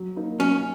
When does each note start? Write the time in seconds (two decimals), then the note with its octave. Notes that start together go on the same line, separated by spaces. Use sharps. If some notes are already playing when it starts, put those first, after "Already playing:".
Already playing: F#3
0.16 A#3 D#4
0.39 F#3 C#4